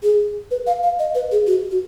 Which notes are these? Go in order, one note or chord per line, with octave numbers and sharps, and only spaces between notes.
G#4
B4
F5
F5
D#5
B4
G#4
F#4
F#4